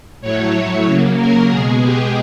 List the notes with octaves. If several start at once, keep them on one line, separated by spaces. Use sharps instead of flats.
A2 F#3 A3 C#5
C#3 F#3 A#3
A#4
B2 G#3 G#4
G4